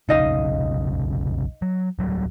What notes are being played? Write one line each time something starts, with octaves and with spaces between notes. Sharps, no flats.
F1 B1 C#3 D#4 D#5 F5
F#3
D1 F#3 G3